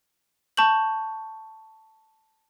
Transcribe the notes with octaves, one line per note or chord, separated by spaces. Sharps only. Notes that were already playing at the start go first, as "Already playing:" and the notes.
A5 C#6 G6 F#7